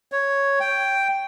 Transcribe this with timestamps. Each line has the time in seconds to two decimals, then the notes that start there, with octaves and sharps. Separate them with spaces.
0.12 C#5
0.60 G5